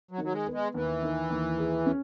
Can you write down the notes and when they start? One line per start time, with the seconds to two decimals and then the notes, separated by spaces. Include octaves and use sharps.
0.11 F#3
0.18 D#3
0.24 F#3
0.33 G#3
0.47 B3
0.54 G#3
0.74 D#2 E3
1.02 D#3
1.30 D#2
1.58 G#4
1.86 C#4